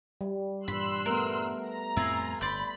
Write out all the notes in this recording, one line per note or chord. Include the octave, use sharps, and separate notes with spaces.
G3
G2 A#2 E3 B5 C6 E6 F#6
A3 B3 A#4
A#5
F2 A2 C4 E4 F4 G#4
G1 D5 B5 C6 G6